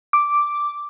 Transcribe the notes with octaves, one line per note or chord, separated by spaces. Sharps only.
D6